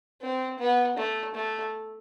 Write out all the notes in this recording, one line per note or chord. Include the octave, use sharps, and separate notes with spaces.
C4
B3
A3
A3